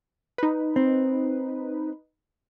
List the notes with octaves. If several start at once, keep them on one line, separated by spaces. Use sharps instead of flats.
D#4 B4
C4